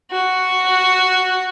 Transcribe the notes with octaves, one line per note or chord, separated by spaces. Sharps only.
F#4